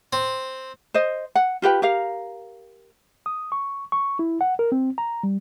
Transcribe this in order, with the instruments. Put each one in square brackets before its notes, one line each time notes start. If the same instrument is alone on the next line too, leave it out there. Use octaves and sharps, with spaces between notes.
[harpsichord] C4
[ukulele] C5 D#5
F#5
F4 G4 B4 G5
G4 A#4 F5
[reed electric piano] D#6
C#6
C#6
E4
F#5
A#4
C4
A#5
G3